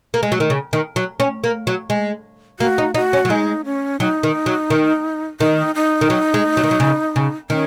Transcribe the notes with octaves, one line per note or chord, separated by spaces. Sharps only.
A#3
G#3
F#3
D#3
C#3
D#3
F#3
C#4
A#3
F#3
G#3
A#3 F#4
D#4
D#4 F#4
C#4
F#3
G#3 D#4
C#4
F#3 D#4
D#3
F#3
D#3
D#3 D#4
D#4
D#3
F#3
G#3
F#3
D#3
F#3
C#3
C#3
D#3 C#4